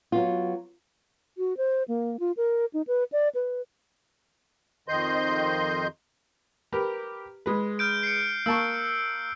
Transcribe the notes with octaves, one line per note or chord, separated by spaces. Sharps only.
F#3 B3 F4
F#4
C5
A#3
F4
A#4
D#4
B4
D5
B4
F2 D#3 D#5 C6 G6
G4 A#4 B4
G#3 B4
F6 G6 D7
C7 C#7
A#3 A5 C#6 E6